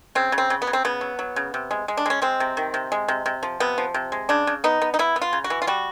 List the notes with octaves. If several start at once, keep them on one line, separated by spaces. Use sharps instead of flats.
C#3 C4
C#3
C4
C#3
B3
C#3
C4
C#3 B3
F#3
F#3
C#3
C3
G#3
G#3
D4
G#3 C#4
G#3 C4
C3
D#3
C3
G#3
C3
C3
F3
C3 B3
F3
C3
G#3
C#3 D4
C#3
B3 D#4
B3
D#4
B3 E4
B3
F4
C#3
F#4
E3
F4
G3 F#4